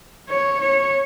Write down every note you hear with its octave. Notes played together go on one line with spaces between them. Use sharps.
C#5
C#5